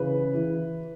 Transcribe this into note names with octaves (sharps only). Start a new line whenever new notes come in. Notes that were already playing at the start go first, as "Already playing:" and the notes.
Already playing: C#3 E3 B4
E3